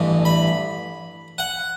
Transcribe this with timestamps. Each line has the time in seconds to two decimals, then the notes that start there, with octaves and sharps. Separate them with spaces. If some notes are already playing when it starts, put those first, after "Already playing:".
Already playing: A1 G2 E3
0.25 B5
1.38 F#5